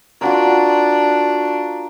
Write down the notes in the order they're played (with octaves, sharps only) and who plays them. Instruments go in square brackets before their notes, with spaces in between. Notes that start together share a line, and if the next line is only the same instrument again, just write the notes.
[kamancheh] D4 [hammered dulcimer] F4 F#4 A#4